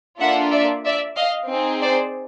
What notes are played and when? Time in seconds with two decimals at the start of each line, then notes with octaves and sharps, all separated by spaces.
0.20 A#3 D4 F4 A4 E5 F#5
0.52 D5 E5
0.85 D5 E5
1.17 D#5 F5
1.49 C4 D#4 G#4
1.81 C5 D5